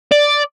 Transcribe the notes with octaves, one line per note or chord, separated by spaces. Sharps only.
D5